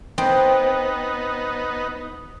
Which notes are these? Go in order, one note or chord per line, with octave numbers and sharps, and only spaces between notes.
B3 C4 D#4